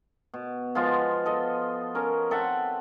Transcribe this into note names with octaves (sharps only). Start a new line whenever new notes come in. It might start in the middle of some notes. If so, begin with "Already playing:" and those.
B2
F3 G#3 B3 F4
A4 D#5
C#4 A#4
C4 A4 E5 F#5